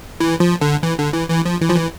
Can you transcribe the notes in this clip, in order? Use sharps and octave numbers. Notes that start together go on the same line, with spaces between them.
E3
F3
D3
E3
D3
E3
E3
F3
E3
F3
E3